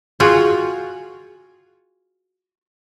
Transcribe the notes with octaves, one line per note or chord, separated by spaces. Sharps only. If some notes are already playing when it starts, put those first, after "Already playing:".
F4 F#4 G#4 G5